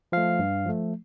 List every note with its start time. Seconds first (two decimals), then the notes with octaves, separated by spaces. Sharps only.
0.12 F3 A3 F5
0.39 G2
0.66 F3 A3